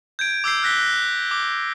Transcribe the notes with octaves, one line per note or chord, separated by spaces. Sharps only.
G6 G#6 D7
D6 E6 G6 C7
E6 F#6 A#6 B6 G7
F#6 A#6
D6